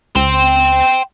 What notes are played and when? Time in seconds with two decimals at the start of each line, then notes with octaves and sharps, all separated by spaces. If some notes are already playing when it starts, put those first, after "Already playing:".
0.15 C#2 G5 C6